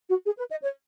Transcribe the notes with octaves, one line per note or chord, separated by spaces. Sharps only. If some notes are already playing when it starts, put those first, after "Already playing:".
F#4
G#4
B4
D#5
C#5